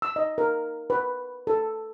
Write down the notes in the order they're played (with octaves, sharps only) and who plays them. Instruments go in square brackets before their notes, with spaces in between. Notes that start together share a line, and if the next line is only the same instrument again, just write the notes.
[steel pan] E6
D#5
A#4
B4
A4